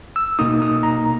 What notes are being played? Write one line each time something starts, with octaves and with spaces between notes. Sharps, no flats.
E6
B2 A#3 D#4 D#6
D#6
A#5